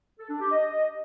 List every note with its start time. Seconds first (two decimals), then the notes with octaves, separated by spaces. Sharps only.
0.18 A4
0.29 D4
0.40 G4
0.51 D#5